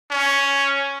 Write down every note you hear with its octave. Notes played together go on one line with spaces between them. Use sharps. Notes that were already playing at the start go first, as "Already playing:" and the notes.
C#4